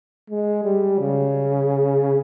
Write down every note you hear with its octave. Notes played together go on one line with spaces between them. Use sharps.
G#3
G3
C#3